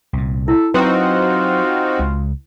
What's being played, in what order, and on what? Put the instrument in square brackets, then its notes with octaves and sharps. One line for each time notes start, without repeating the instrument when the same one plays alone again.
[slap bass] C2 A#2
[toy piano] E4 [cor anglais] A4
[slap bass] F#3 [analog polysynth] C4 D#4 F#4 [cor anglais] F4 [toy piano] B4
[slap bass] C#2 C#3 G#3